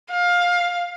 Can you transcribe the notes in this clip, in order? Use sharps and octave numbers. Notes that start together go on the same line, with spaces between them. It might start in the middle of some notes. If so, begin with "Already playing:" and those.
F5